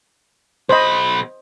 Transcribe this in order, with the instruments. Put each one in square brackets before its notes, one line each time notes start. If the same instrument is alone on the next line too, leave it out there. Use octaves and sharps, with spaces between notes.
[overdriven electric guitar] B1 B5 [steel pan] C5 D#5